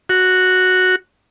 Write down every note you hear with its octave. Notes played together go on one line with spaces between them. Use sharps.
F#4